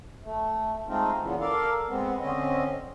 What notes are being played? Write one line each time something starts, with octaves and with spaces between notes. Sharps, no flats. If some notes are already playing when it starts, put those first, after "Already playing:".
A3
G#3 A3 C4 D#4 F4
A#2 C#3 E3 B3
A4 A#4 D5 F5
G#3 B3 C4
D3 C4 C#4 D#5